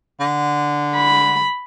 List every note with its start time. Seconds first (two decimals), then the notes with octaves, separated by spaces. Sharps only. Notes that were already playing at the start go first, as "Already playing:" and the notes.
0.20 D3
0.96 B5